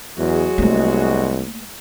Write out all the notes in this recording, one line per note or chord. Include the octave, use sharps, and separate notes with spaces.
E2 F#3 G#3 F#4
C2 A3 A#3